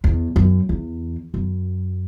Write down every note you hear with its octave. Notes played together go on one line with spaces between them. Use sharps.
E2
F#2
E2
F#2